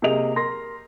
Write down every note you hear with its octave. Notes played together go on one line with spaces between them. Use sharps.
C3 A#3 G#4 D#5 F7
A#4 C6 A#6